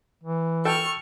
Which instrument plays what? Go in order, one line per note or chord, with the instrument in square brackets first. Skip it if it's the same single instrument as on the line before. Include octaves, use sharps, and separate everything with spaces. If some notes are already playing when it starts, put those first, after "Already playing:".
[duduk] E3
[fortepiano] A4 G5 [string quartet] C#6 F6